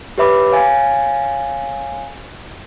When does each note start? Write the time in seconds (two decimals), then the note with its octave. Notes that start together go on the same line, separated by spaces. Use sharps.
0.18 G4 B4 C#5 E5 B5 D6
0.52 C#5 F5 G#5 A6